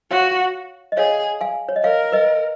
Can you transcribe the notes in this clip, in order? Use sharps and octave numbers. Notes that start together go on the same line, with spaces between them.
F#4 C#5 F5
D#5
G#4 C#5 F5
F5 G#5
C#5
D#5
A#4 C#5 F5
B4 D#5